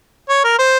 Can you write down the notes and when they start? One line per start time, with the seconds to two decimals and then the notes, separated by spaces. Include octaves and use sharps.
0.29 C#5
0.44 A#4
0.59 C5